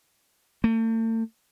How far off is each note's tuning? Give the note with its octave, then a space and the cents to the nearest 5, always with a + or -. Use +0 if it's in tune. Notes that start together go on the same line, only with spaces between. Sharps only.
A3 +40